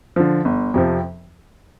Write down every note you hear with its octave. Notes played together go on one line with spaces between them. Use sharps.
D3 F3
G1
F2 C3 F3